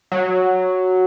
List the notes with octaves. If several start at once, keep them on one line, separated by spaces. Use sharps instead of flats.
F#3